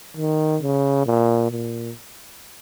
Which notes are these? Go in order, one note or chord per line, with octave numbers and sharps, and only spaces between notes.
D#3
C#3
A#2
A#2